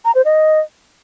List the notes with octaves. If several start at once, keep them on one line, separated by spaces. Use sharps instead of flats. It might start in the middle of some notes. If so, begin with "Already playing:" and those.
A#5
C5
D#5